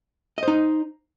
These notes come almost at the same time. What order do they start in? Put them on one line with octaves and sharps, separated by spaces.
D#5 C5 D#4